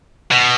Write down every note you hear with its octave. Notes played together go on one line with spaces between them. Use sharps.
B2